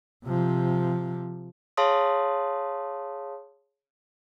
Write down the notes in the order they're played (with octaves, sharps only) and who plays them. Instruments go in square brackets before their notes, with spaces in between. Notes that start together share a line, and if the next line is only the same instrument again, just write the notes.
[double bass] C3 F3
[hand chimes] G#4 C#5 F5 A5 C6 D#6